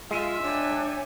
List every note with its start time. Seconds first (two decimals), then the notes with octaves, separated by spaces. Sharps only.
0.11 G#3 F4 E5
0.42 D4 C#5 G5 G#5